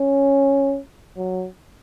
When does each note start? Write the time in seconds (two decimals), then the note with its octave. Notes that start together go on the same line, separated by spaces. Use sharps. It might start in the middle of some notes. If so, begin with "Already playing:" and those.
Already playing: C#4
1.17 F#3